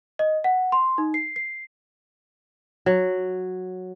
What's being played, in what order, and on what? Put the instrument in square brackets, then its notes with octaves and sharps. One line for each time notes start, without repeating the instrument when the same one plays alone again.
[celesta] D#5
F#5
C6
D#4
C7
C7
[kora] F#3